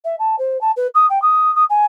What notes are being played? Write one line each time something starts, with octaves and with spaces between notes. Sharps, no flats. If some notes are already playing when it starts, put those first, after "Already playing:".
E5
A5
C5
A5
B4
D#6
G5
D#6
D#6
G#5